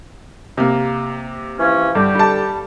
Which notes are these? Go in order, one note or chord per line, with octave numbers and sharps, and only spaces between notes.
C3 A#3
E3 F3 C#4
G2 D3 G4
G3 A5